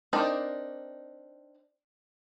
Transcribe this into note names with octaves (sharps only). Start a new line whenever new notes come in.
C4 D4 D#4 A#4 D5